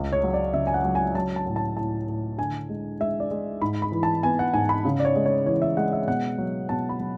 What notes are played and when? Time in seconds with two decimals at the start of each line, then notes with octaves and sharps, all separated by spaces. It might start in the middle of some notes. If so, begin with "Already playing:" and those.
Already playing: C#2 G#3
0.13 C#5
0.24 F#3
0.34 D5
0.53 C#3 E5
0.67 G#5
0.74 F#5
0.84 F#3
0.95 G#5
1.15 F#3 A5
1.36 A5
1.46 A2
1.56 A5
1.77 A2 A5
2.07 A2
2.38 D3 G#5
2.69 G#3
3.00 G#3 E5
3.20 D5
3.31 G#3
3.62 G#2 B5
3.82 B5
3.92 E3
4.03 A5
4.23 B3 G#5
4.39 F#5
4.54 G#2 G#5
4.69 B5
4.85 C#3
5.00 D5
5.05 C#5
5.16 G#3
5.26 C#5
5.46 E3 C#5
5.62 E5
5.77 G#3 F#5
5.93 E5
6.07 B2 F#5
6.38 F#3
6.69 B2 A5
6.89 B5
7.00 F#3